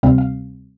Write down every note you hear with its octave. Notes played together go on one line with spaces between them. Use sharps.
D2 C3 G3 C4 F5
F5